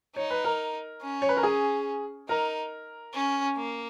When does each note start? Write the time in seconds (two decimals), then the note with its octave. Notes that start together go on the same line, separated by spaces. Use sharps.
0.16 D#4 C#5
0.31 B4
0.44 A#4
1.01 C#4
1.22 C#5
1.29 B4
1.37 A#4
1.43 G#4
2.29 D#4 A#4
3.14 C#4
3.56 A#3